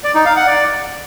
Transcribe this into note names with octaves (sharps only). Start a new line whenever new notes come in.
D5
D#4
F5
F#5
D5